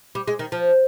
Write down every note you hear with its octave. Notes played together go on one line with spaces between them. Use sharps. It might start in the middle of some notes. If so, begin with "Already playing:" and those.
G3
G#3
D#3
F3